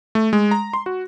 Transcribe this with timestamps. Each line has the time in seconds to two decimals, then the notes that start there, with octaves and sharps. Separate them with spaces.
0.15 A3
0.33 G#3
0.51 A#5
0.73 C6
0.86 F#4